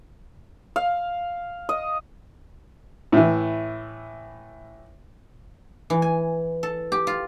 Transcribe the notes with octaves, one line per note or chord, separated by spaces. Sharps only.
F5
D#5
A2 E3
E3
G#5
A4
G4
F4